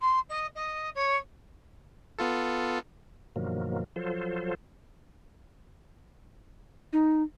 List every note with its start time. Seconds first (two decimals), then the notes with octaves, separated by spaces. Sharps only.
0.01 C6
0.29 D#5
0.55 D#5
0.95 C#5
2.19 B3 F4 A4
3.36 G2 B2 D#3 F3 F#3 A#3
3.96 F3 F#3 F4 A4 C5
6.93 D#4